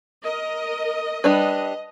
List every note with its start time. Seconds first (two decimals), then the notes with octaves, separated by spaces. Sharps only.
0.24 A#4 D#5
1.24 G3 D4 B4 D#5